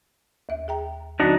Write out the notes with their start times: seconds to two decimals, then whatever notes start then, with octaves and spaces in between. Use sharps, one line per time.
0.49 D#2 E5
0.68 G#4 G5 A#5
1.20 D3 F#3 C4 D4 D#4 F#4